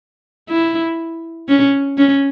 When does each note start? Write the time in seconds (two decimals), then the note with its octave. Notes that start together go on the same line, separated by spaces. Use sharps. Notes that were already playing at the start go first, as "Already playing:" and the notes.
0.50 E4
1.48 C#4
1.98 C#4